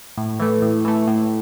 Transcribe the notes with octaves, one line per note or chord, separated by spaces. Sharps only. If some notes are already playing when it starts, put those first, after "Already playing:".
A2
E3 A3
A2
E3 A3
A2